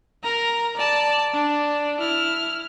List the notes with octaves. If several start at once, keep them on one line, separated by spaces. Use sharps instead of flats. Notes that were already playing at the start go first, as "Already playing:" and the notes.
A#4 A#5
D5 A5
D4
E4 F6